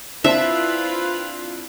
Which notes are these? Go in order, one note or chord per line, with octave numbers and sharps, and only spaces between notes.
C4 D4 E4 F4 B4 E5